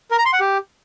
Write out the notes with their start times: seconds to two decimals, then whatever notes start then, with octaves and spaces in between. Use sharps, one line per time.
0.11 A#4
0.18 A#5
0.26 C6
0.33 F#5
0.40 G4